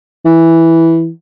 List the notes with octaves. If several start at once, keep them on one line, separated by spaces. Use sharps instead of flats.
E3